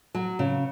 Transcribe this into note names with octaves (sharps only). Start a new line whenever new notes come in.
F#3
C#3